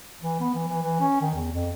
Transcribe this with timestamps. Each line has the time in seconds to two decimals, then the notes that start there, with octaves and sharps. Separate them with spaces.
0.22 E3
0.40 B3
0.55 E3
0.69 E3
0.83 E3
1.01 C#4
1.21 D#3
1.35 E2
1.52 F2